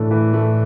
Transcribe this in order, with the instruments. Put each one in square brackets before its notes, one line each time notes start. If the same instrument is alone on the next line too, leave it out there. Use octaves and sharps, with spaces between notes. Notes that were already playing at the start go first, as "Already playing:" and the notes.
Already playing: [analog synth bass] A2 [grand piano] E3 A3 D4
[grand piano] E3
A3